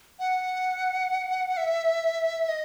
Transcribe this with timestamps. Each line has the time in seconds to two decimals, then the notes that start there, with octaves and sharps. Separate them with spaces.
0.19 F#5
1.57 E5
2.48 D#5